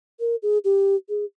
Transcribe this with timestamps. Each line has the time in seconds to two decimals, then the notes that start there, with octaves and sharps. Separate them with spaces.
0.20 A#4
0.43 G#4
0.65 G4
1.09 G#4